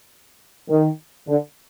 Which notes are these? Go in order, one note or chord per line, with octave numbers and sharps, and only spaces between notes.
D#3
D3